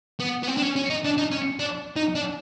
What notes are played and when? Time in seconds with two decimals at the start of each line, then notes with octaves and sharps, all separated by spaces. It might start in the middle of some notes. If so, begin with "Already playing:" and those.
0.20 B3
0.43 B3
0.48 C4
0.57 D4
0.62 C#4
0.76 C#4
0.90 D#4
1.04 D4
1.18 D#4
1.32 C#4
1.60 D4
1.96 D#4
2.15 D4